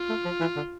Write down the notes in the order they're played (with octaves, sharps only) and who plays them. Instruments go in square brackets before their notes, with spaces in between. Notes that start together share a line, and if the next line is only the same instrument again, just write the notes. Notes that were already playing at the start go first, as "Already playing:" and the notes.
Already playing: [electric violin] F4
[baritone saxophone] A3
F3
E3
D3